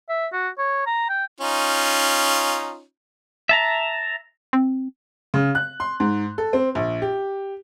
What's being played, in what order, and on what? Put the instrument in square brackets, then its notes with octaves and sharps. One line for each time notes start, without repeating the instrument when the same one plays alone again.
[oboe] E5
F#4
C#5
A#5
G5
[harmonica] C#4 D#4 F4
[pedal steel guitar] E5 A5 A#5
[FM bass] C4
[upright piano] C#3
F#6
C6
G#2
A4
C4
A#1
G4